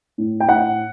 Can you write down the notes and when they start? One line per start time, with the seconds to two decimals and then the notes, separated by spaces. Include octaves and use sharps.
0.18 A2
0.40 G5
0.48 A2 F#5